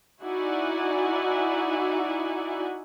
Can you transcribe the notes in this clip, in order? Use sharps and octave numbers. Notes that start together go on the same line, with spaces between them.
D#4 E4 F#4 D5 F#5 G#5